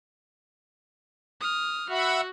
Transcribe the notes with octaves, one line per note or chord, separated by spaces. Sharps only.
D#6 F6
F#4 E5 F#5 B5